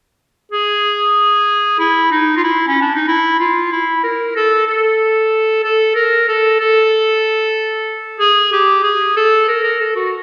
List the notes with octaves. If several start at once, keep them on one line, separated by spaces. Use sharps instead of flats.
G#4
E4
D#4
F4
E4
C#4
D4
D#4
E4
F4
E4
A#4
A4
A4
A4
A#4
A4
A4
G#4
G4
G#4
A4
A#4
A#4
A4
F#4